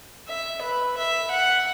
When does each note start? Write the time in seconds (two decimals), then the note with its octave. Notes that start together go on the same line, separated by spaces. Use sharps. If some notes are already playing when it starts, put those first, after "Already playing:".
0.28 E5
0.62 B4
0.97 E5
1.31 F#5